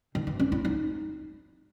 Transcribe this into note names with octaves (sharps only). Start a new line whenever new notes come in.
D#3
E3
C#4
E4
D#4